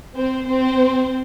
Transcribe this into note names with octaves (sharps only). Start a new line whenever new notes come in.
C4 C5
C4 C5